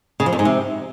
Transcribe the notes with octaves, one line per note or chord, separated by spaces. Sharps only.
C#3
F3
F2
G#2
C3